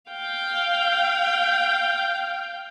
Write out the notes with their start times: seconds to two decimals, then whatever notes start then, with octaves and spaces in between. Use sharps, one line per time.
0.10 F5 G5